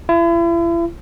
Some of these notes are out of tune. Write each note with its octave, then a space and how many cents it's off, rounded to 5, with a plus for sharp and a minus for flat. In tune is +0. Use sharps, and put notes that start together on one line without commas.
E4 +40